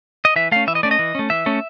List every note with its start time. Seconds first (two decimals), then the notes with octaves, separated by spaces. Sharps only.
0.25 D#5
0.36 E3 E5
0.52 A3 C#4 F5
0.67 E3 E5
0.75 D#5
0.83 A3 C#4 D5
0.91 D#5
0.99 E3
1.15 A3 C#4
1.30 E3 E5
1.46 A3 C#4